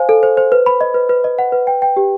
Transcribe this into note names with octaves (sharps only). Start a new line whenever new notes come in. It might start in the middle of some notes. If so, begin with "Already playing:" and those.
Already playing: C5 F5 G#5
A4
C5
C5
B4
B5
D#5
B4
B4
D#5
F#5
B4
G5
G5
G4